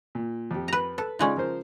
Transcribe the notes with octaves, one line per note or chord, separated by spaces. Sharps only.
A#2
F2 G4
B4 A#5
A4 B4
C#3 G#3 C#4 D#4 F4 D5
F3 A#4 C5